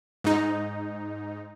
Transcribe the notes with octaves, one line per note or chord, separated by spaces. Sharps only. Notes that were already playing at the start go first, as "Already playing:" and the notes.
G#2 D#4